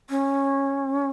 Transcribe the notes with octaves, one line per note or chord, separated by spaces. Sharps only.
C#4